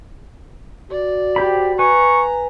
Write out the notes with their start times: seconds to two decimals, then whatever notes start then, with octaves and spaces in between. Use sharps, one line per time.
0.91 F#4 D5
1.36 G4 C5 B5
1.79 B4 G#5 A#5 C#6